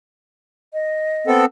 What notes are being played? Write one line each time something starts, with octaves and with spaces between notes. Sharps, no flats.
D#5
B3 C4 A4